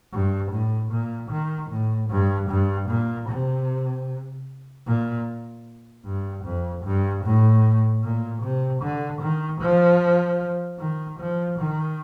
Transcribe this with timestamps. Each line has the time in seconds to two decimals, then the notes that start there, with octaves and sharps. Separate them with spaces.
0.12 G2
0.52 A2
0.91 A#2
1.31 D#3
1.70 A2
2.10 G2
2.49 G2
2.89 A#2
3.29 C3
4.86 A#2
6.05 G2
6.45 F2
6.84 G2
7.24 A2
8.03 A#2
8.42 C3
8.82 D3
9.21 D#3
9.61 F3
10.79 D#3
11.19 F3
11.59 D#3